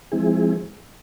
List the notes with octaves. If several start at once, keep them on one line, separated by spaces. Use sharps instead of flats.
F3 G#3 C4 E4 G#4